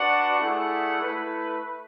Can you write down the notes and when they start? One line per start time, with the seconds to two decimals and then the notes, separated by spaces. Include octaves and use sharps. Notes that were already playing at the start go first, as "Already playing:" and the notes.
Already playing: D4 F#4 B4 D5 F#5
0.38 A3 E4 G#4 D5 F#5
1.00 A3 E4 B4